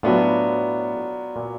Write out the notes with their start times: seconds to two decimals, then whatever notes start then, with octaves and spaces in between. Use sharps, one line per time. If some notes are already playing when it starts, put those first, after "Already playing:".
0.03 A2 F#3 B3 D4 F4
1.36 A#2